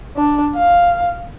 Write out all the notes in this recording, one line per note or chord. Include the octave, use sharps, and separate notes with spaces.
D4
F5